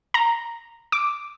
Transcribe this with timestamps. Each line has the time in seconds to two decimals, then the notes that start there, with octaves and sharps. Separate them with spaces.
0.14 A#5
0.92 D6